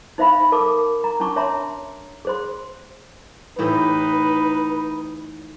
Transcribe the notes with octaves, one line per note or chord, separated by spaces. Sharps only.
D#4 C5 E5 F5 B5
A4 A#4 A5 D6
A#5
C#4 D4 A5 C#6 D6
C#5 E5 A5 A#5 C6
G#4 C5 C6
A2 E3 D#4 G4 B4